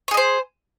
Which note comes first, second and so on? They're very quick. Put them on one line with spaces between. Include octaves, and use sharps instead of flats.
C#5 G#4 D#5 C5